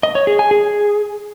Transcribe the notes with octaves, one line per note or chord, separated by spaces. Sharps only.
D#5
C#5
G#4
G#5
G#4